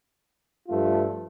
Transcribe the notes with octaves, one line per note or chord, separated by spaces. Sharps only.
G2 F3 A3 F4